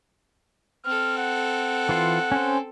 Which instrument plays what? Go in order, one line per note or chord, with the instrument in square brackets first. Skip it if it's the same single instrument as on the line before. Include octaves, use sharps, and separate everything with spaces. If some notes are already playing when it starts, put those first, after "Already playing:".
[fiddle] C4 A4 [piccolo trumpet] F6
[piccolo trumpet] F#5
[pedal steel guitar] E3 F4
C#4 C5